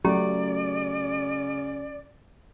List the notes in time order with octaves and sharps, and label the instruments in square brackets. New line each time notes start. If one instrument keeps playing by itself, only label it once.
[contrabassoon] C#3 [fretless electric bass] F#3 A3 [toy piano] C#4 G4 A#5 [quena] D5